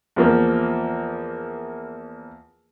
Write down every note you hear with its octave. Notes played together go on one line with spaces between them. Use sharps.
E2 F3 A#3